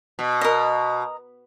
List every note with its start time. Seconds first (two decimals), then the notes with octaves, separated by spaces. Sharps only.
0.19 B2
0.41 A#4 D#5